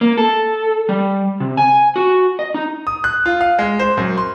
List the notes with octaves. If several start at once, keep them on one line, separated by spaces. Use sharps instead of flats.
A#3
A4
G3
C3
G#5
F#4
D#5
D#4
D#6
F#6
F4
F5
G#3
C5
F#2
C6